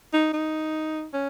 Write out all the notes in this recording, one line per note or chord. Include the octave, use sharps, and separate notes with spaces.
D#4
D#4
C#4